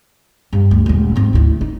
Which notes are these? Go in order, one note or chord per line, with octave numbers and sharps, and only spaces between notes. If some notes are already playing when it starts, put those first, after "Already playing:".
G2
D2
D#1 G#3
G#2 C4
D2 E4
D#4